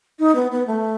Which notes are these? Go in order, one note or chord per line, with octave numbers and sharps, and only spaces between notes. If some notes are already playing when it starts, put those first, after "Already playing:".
D#4
B3
B3
A3